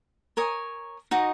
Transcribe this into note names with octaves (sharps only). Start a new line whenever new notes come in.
A#4 C#5 G#5 D#6
D#4 F#4 D#5